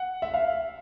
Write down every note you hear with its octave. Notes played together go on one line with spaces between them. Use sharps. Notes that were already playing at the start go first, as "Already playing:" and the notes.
Already playing: F#5
E5
F5